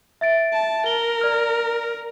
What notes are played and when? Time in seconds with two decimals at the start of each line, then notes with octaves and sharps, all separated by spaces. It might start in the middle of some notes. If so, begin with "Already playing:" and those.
0.21 E5 A6 D7
0.53 A5
0.86 A#4 G7
1.21 D5 F6